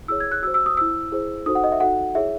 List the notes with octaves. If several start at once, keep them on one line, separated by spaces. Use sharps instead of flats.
E4 G#4 C#5 E6
G#6
F#6
F#4 C5 E6
E6
D#6
E4 C5 E6
E4 G#4 C5
D#4 F#4 A4 C5 D#6
F#5
D#5
E5
D#4 F#4 A4 F#5
E4 G#4 C#5 E5